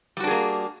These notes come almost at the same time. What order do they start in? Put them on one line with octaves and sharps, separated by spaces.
G3 F#4 D4 G#4 A#3